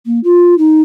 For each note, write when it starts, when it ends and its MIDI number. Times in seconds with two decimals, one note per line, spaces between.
0.06 0.19 58
0.24 0.54 65
0.58 0.81 63